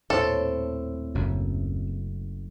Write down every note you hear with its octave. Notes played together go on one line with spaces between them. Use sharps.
D#1 A2 C4 A4
F#1 F#2